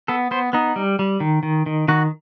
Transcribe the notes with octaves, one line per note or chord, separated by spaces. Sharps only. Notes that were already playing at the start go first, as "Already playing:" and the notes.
B3 A4
B3 C5
B3 D#4
G3
G3
D#3
D#3
D#3
D#3 F#4